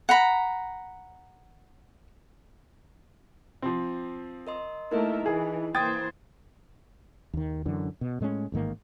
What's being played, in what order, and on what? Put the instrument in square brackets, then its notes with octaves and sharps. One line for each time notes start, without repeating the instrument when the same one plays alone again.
[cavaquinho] F#5 A#5 B5
[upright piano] F3 C4
[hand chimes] A#4 D#5 C6
[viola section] A3 A#4 E5 [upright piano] A#3 [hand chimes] D#4 E4 D#5
[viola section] E3 [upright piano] G#4
[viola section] E3 A#3 C5 [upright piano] G5 D#6 A6 [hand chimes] G#6
[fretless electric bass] D#2 D#3
F#2 D3 E3
B2
A2 G#3 A3 C#4
A1 G#2 D#3 A#3